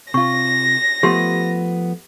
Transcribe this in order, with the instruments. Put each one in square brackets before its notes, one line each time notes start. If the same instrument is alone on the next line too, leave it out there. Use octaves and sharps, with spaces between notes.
[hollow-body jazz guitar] C3 F4 [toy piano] C#6 [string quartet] A#6
[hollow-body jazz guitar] F3 A3 B3 [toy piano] G4 C6